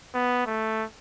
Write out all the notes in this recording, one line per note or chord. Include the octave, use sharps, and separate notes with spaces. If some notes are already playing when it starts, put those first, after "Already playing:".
B3
A3